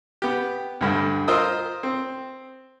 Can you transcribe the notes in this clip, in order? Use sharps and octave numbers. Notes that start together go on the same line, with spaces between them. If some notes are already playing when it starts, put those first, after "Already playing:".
B3 G4
D2 G2 D3
F4 A#4 C5 D#5 D#6 E6
C4